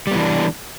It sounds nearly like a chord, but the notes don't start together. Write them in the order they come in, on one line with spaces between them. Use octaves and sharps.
G3 B3 E3 D4